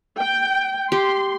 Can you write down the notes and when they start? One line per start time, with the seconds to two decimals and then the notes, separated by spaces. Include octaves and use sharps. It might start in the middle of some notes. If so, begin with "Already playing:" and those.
0.17 G5
0.92 G4 C6